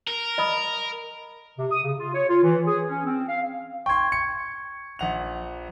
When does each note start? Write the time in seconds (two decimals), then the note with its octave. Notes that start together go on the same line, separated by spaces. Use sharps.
0.07 A#4
0.38 D#5 B5 D#6
1.58 C3
1.72 D#6
1.84 C#3
1.99 F4
2.15 C#5
2.29 F4
2.44 E3
2.67 G#4
2.87 C#4
3.05 C4
3.29 F5
3.86 G5 C6 C#6 G#6
4.12 C#7
4.99 A#1 F#5 F7